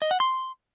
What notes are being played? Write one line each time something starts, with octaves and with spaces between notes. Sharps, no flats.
D#5
F#5
C6